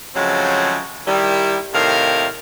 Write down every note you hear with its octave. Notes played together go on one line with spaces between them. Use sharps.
C#3 F3 F#3 G#3 A3 C4
D#3 G3 E4
A2 C3 D#3 A#4 F5